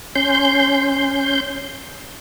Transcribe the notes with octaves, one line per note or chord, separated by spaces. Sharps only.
C#4 C6 G6